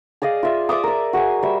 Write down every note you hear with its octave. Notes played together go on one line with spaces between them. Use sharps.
G#4 D5 D#5 F5
F4 E5
D5 E5 D6 D#6
A#4 D5
F#4 G#4 D#5 G#5
G3 E5